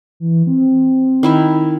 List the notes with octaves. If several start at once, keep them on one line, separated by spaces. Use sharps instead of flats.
E3
C4
D#3 E4 E5